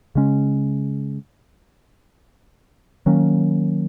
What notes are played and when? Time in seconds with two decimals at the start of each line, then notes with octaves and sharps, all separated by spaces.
0.15 C#3 G#3 C#4
3.06 D#3 F#3 A#3 C#4